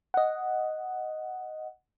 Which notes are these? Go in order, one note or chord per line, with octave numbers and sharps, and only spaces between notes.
D#5 F#5